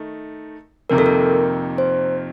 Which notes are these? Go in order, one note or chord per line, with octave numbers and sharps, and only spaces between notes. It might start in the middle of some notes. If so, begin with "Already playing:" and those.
Already playing: D#3 A3 D#4
F2 C3 D#3 A#3 A#4
A4
A#4
C5